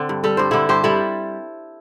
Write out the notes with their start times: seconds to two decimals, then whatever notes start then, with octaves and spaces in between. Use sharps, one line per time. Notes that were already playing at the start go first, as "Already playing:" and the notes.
Already playing: D3 C4
0.09 G2
0.24 G3 A4
0.37 G2 C5
0.51 D3 E4 A4
0.69 G2 G4 C5
0.84 G3 E4 A4